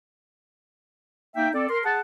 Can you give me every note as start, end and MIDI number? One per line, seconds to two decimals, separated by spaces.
1.35 1.49 58
1.35 1.49 63
1.35 1.49 76
1.35 1.49 79
1.53 1.65 60
1.53 1.65 69
1.53 1.65 74
1.69 1.79 70
1.69 1.79 84
1.84 1.99 68
1.84 1.99 78
1.84 1.99 81